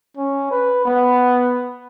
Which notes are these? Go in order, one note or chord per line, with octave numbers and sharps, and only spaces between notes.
C#4
B4
B3